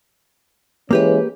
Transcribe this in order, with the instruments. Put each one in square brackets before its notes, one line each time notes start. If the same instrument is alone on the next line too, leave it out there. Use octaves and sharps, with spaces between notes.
[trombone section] E3 G#3 C#4 [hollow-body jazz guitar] A#3 G4 B4